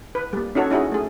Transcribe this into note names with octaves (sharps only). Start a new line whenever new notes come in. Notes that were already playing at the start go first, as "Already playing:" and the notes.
B4
G3 A#3
C#4 D#4 F#4 A4 C#5
C#4 D#4 E4 F#4 G#4
A3 G#4